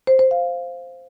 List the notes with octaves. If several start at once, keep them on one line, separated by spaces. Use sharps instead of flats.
C5
C5
F5